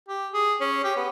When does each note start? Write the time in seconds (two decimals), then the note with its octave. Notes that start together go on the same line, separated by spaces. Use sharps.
0.09 G4
0.34 G#4
0.61 C#4
0.84 G4
0.97 B3